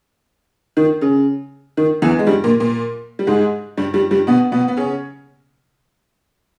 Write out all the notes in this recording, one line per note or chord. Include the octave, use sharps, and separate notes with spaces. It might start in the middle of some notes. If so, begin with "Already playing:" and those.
D#3
C#3
D#3
E2 E3
G#3
G2 G3
A#2 A#3
A#2 A#3
G3
G#2 G#3
G2 G3
G2 G3
G2 G3
B2 B3
B2 B3
B3
C#3 C#4